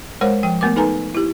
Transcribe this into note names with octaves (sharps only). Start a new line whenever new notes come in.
G#3 A#4 C5 C#5 F#5
F3 G5
A3 B3 A#4 D6
D#4 A4 B4 G#5 A#5
E4 G4